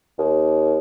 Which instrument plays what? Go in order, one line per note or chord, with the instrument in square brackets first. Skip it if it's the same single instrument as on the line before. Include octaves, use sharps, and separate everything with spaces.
[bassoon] D#2